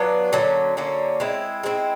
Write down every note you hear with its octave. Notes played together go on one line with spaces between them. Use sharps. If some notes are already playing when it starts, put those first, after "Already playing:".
Already playing: F#3 B3 D4 F4
D3 F#3 A#3 C#4
D3 F#3 A#3 C#4
G#3 C4 E4
G#3 C4 E4